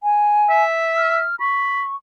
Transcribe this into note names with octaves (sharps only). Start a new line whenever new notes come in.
G#5
E5
F6
B5 C#6